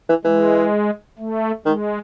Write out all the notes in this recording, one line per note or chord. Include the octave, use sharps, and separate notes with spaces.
E3
E3 G#3
A3
D#3 G#3